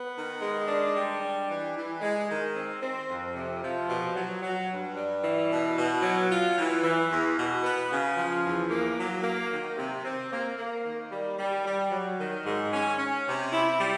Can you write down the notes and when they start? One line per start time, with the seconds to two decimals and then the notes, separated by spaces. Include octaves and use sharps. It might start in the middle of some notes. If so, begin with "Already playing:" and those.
Already playing: B3
0.15 D#3
0.41 G#3
0.68 D4
0.94 G3
1.21 D4
1.48 E3
1.75 E3
2.01 G#3
2.28 D#3
2.55 C4
2.82 C4
3.09 F2
3.35 C3
3.62 F3
3.89 B2
4.15 F#3
4.42 F#3
4.70 G2
4.96 G3
5.22 E3
5.50 B2
5.76 B2
6.02 F#3
6.29 F4
6.56 E3
6.83 E3
7.10 E2
7.37 B2
7.63 B3
7.91 C#3
8.17 F3
8.43 E2
8.70 A#3
8.98 F#3
9.23 A#3
9.51 D#3
9.77 C3
10.04 C4
10.31 A#3
10.58 A#3
10.85 D#3
11.12 G3
11.39 G3
11.65 G3
11.91 F#3
12.18 D#3
12.45 G#2
12.72 C#4
12.98 C#4
13.26 C3
13.53 E4
13.79 G3